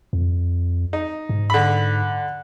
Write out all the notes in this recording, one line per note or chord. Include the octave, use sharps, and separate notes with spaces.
F2
D#4
G#2
D3 B5